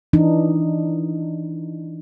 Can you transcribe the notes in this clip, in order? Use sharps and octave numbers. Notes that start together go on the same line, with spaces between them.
E3 D4 D#4